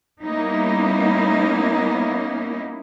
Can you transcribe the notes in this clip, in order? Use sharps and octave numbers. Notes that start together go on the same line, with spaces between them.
G3 A#3 B3 C#4 D#4 E4